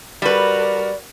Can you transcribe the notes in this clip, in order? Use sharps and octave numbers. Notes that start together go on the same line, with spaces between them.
G3 F#4 A#4 B4 D5